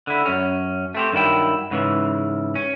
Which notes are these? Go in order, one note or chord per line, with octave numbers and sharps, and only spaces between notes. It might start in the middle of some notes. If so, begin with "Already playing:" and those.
D3 E4
F#2 C#4
A3 C4 G4
G2 D#3 F#3 E4 G5
G#2 C#3 E3
C#4